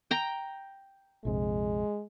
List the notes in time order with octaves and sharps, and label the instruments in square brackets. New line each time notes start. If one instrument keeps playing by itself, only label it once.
[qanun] G5 A#5
[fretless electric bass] A#1 F2 C3 [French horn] G#3